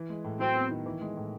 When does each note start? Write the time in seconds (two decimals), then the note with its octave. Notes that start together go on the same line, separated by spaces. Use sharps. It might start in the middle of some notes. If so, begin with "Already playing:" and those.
Already playing: E3
0.10 G#3
0.24 A2
0.40 F#3 C4
0.55 B3
0.71 D#3
0.86 E3
1.01 G#3
1.17 A2